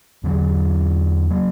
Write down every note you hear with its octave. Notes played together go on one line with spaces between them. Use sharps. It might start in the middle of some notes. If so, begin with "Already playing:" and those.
E2 D3 F#3
F#3 A#3